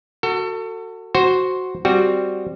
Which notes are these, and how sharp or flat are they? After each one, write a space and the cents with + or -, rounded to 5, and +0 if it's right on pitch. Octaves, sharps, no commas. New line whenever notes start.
F#4 +0 A4 +30
F#4 +0 C5 +5
G3 +0 C4 +0 F#4 +0